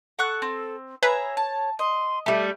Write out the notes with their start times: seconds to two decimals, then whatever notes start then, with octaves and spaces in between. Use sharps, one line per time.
0.19 A4 F#5 C#6 F#6
0.42 C4
1.03 G#4 B4 C#5 E5 A#5
1.37 A5
1.79 D#5 C6
2.26 G3 A3 A4